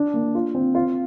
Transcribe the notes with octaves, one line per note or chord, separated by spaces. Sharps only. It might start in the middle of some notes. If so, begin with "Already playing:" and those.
Already playing: D4
A#3
F4
C4
F4